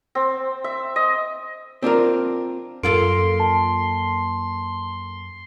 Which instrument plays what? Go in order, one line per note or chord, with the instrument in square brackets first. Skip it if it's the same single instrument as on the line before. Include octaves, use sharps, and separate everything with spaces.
[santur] C4
E5
D#5
[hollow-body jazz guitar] C4 D4 F4 A#4
[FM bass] F#2 [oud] A#3 F4 A4 [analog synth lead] C6 [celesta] D7
[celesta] A5